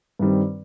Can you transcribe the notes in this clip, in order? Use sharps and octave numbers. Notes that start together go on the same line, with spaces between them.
G2 D#3 G3 C4